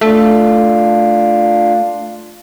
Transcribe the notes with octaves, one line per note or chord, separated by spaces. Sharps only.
A3 D4 F4